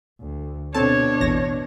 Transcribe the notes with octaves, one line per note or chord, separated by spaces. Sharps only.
D2
B2 C4 D4 A4 C#5 A5
A1 E2 A#6